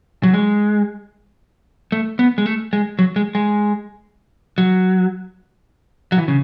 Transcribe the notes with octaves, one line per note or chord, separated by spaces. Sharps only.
F#3
G#3
A3
B3
G#3
A3
G#3
F#3
G#3
G#3
F#3
F#3
E3
C#3